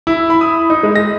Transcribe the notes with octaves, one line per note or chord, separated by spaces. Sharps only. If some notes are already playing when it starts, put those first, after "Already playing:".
E4
B5
D#6
D#4
G#3
A#6